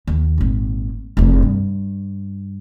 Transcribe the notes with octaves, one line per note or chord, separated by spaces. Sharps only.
D#2
G#1 A#2
F1 E2
G2